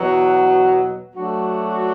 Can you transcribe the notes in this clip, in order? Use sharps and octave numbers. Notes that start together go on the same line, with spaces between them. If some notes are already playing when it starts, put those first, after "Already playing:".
Already playing: E2 B2 F#3
F#3 A3 D4 F#4